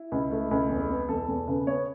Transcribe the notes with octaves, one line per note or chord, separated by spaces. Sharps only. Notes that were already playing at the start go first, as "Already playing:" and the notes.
Already playing: E4
C#2
A3
C#2
E2
B3
E2 A4
E2
C#3 B4
B3 C#5